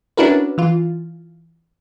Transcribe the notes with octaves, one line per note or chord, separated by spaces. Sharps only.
C#4 D4 E4 F#4 A#4 B4
E3 F4